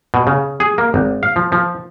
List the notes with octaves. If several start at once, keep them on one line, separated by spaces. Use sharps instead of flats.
B2
C#3
G#4
A#3
G#1
F5
F3
F3